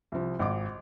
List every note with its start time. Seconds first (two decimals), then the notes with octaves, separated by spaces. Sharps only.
0.12 C2 F3
0.39 G#1 D#5 D6